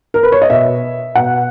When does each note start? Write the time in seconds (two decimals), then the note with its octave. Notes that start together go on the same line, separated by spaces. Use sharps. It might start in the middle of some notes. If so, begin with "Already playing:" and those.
0.14 A#4
0.23 B4
0.32 C#5
0.42 D#5
0.50 B2 E5
1.15 B2 F#5